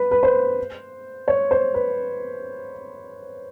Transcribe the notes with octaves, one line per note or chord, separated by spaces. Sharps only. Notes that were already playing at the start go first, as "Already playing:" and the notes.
Already playing: B4
B4
C5
C#5
C5
B4